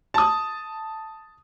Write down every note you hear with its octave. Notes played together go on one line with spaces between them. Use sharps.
A5 D#6